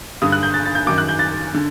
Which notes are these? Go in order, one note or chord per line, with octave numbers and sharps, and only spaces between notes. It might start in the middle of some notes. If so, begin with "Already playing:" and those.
G2 D3 D#6
F#6
G6
A6
A6
G6
F#2 D#3 D6
F#6
G6
A6
D3